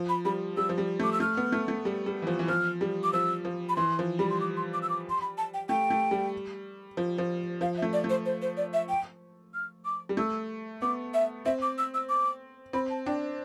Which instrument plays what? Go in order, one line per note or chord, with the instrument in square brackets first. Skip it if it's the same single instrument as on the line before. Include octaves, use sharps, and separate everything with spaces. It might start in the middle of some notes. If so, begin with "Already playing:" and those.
Already playing: [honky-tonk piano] F3
[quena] B5
[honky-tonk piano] G3 [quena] B5
[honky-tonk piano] G3 [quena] E6
[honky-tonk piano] F3
G3
[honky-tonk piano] A3 [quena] D6
[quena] E6
[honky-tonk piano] A3 [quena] F6
[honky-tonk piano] B3
A3
A3
G3
G3
E3
F3
E3
[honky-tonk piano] F3 [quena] F6
[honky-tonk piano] G3
[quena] D6
[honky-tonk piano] F3 [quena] E6
[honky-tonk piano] F3
[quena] B5
[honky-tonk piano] E3 [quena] C6
[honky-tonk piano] F3
[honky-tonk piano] G3 [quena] B5
[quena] C6
D6
C6
D6
E6
D6
C6
B5
A5
G5
[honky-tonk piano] A3 [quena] G5
[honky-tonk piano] A3
G3
F3
F3
[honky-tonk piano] F3 [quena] F5
[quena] E5
[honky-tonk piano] A3
[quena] D5
[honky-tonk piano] A3
[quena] C5
C5
C5
D5
E5
G5
F6
D6
[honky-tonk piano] G3
[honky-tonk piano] A3 [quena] E6
[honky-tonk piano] B3 [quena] D6
[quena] E5
[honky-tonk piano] C4 [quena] E5
[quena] D6
E6
E6
D6
[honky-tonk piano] C4 [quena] B5
[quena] A5
[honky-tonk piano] D4 [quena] G5